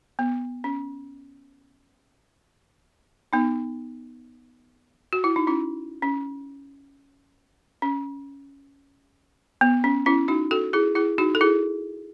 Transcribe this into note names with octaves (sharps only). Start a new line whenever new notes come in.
B3
C#4
B3 D#4
F#4
E4
D#4
C#4 E4
C#4
C#4
B3
C#4
C#4 E4
D#4 F#4
F#4 A4
E4 G#4
E4 G#4
D#4 F#4
A4
E4 G#4